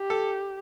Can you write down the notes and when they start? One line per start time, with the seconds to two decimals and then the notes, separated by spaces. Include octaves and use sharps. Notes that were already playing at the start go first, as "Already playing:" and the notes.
Already playing: G4
0.10 A4